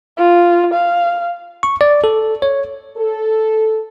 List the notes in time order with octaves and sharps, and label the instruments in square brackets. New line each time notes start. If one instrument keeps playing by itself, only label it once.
[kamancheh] F4
F5
[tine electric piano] C#6
D5
A4
C#5
[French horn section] A4